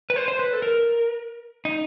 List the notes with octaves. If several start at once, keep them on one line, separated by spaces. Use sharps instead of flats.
B4
C5
C5
B4
A4
A#4
D#4